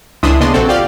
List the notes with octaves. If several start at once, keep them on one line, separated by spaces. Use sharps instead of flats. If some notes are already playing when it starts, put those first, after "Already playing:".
C#2 E3 D4 E5 C6 D#6
C#3 A#3 B3 D4 D#5 C6
A#1 A#2 C4 F#4 A4
F4 G4 D5 F5